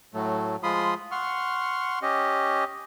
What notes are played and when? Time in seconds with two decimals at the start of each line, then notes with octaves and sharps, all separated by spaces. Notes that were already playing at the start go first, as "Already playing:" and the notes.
0.14 A2 F#3 A3
0.63 F3 G#3 F4 B5 C6 D#6
1.11 F#5 C6 C#6 F6
2.02 C#4 G4 D#5